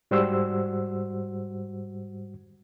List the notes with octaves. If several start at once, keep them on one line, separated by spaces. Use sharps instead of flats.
G#2 G3 F#4 C5 F#5 E6